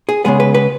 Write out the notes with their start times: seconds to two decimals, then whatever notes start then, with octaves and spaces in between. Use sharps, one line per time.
0.09 G#4
0.25 C#3 G#3 B3 G#4
0.40 B4
0.55 B4